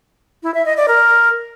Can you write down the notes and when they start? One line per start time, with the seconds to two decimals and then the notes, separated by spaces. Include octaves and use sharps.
0.43 E4
0.54 E5
0.65 D#5
0.77 D5
0.88 A#4